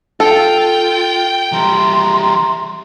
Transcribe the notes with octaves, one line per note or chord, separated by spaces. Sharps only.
F4 A4 G5
E3 G3 E5 A#5 C6